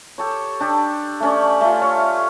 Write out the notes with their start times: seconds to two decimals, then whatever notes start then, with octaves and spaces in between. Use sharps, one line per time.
0.18 G4 A4 C#5
0.60 D4 G4 A4
1.20 A3 C#4 D5
1.61 A3 F4
1.82 C#5